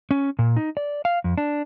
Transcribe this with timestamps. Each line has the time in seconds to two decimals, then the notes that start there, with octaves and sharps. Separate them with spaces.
0.11 C#4
0.39 A#2
0.57 D#4
0.77 D5
1.05 F5
1.24 F2
1.38 D4